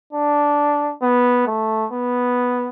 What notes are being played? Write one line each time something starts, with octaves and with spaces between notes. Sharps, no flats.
D4
B3
A3
B3